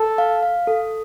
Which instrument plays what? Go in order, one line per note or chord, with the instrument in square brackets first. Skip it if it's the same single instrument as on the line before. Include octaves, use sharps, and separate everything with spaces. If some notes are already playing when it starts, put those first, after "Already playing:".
Already playing: [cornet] A4
[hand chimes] F5
F5
A4